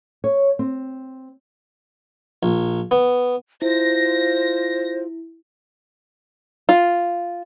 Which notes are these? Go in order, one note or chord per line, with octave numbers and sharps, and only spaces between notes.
C#5
C4
A#1
B3
E4 F4 C5 A#6
F4